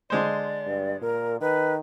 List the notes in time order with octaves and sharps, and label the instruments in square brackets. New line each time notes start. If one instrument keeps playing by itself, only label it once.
[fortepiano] D3 G#3 C5 [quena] D5
[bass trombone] G2
[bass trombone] A#2 [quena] A#4
[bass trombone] D#3 [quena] B4